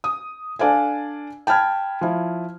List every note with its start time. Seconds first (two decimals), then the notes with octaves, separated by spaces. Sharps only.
0.04 D#6
0.59 D4 A4 D5 F5 G#5
1.47 G5 A5 B5 F6 G#6
2.01 F3 E4